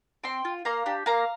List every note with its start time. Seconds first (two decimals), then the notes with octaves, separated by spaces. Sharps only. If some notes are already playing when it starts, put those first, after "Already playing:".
0.24 C4 G5 C6
0.45 F4
0.65 A#3 F5 A#5
0.86 D4 G4
1.06 A#3 F5 A#5